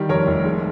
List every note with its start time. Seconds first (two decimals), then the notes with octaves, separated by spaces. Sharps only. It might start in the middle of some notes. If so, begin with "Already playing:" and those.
Already playing: D#3 G3
0.09 F2 A#4 C#5
0.27 F1
0.45 G#3